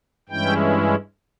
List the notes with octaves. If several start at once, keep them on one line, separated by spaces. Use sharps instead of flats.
G2 E3 G#3 C#4 E4 G5